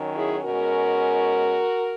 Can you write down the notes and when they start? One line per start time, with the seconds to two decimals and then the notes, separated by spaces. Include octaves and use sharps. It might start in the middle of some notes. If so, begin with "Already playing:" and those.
Already playing: D#3 F#3 C#4
0.16 E4 G#4
0.45 B2 G#3 C#4 F#4 A#4